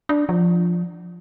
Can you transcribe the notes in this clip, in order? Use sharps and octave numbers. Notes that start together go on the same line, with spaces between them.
D4
F3